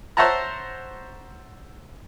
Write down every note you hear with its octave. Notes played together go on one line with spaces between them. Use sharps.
C5 C#5 E5 F#5 A5 A#5